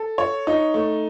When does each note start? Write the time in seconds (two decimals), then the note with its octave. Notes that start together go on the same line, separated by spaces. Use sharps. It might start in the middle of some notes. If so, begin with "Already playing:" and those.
Already playing: A4
0.18 C#5
0.47 D#4
0.74 A3